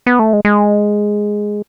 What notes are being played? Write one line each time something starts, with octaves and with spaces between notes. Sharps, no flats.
B3
A3
G#3
G#3